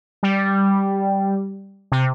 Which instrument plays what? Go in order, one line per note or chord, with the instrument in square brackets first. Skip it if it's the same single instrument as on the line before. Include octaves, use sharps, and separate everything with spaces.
[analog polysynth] G3
C3